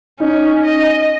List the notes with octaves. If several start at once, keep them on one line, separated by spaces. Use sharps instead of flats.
C#4 D#4
D#5